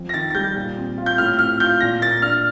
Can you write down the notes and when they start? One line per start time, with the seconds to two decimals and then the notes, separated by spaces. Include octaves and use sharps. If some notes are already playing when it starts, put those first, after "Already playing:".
Already playing: F2
0.09 A#6
0.14 D#3 A6
0.30 A6
0.35 G3 G6
0.55 A#2
0.76 C4
0.98 F4
1.06 G6
1.18 A2 F6
1.39 C4 F6
1.60 F4 G6
1.80 A#2 A#6
2.02 A#3 A6
2.22 D4 F6